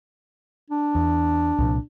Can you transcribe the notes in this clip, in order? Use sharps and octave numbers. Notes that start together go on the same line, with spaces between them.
D4
E2
C2 A#2 F3